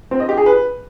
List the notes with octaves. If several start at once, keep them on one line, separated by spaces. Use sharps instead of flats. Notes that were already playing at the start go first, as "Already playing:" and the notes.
C4
D#5
G4
G#4
B4